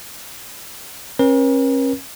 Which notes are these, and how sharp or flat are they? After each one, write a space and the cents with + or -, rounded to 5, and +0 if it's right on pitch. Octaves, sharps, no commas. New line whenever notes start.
C#4 -40 A#4 +45